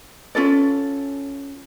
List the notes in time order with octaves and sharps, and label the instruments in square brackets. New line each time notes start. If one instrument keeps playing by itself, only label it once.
[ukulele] C#4 F4 A4 D5